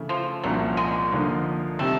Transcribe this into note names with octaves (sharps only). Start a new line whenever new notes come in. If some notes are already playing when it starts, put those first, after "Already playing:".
Already playing: C#3 E3 A3
F3
C2 A#2 F3 F#3 A#3 C#4
G#3
D3 F3 A#3 D#4
C3 D#3 G3 A3 C4